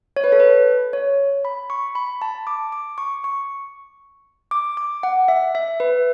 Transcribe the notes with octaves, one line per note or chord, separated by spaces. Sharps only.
C#5
B4
A4
B4
C#5
B5
C#6
B5
A5
D6
D6
C#6
C#6
D6
D6
F#5
E5
E5
B4